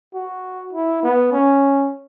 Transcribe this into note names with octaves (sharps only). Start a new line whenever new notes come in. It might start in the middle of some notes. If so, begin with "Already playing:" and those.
F#4
E4
B3
C#4